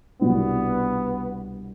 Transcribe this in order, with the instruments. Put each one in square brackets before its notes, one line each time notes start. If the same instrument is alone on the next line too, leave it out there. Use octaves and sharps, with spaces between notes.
[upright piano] C2 B2 G3 D4 [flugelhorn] B3